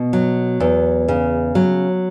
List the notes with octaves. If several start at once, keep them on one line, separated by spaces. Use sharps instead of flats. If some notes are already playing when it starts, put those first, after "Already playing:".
Already playing: B2
F#3
E2
C#3
F#3